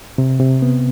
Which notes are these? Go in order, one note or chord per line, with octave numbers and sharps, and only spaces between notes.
C3
C3
B3